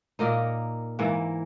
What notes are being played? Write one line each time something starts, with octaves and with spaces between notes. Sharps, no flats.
A#2 A#3 D#4 A#4
G#2 E3 A#3 E4